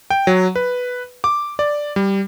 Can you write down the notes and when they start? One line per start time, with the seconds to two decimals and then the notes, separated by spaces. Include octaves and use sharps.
0.10 G5
0.27 F#3
0.56 B4
1.24 D6
1.59 D5
1.96 G3